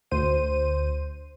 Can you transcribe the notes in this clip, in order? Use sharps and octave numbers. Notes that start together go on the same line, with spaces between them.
D2 C5 D#7